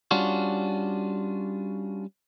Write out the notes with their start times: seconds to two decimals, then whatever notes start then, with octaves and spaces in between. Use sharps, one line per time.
0.11 G3 C#4 D4 F4 F#4